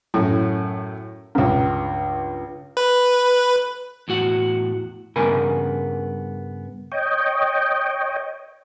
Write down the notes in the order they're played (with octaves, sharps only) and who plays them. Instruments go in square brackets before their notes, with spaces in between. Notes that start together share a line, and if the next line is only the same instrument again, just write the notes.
[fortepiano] F#2 A2
C#2 G2
[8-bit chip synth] B4
[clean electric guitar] E2 A2 F#4 F#5
[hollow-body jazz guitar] G2 C#3 B3 A#4 G#5 B5
[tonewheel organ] C#5 D#5 G5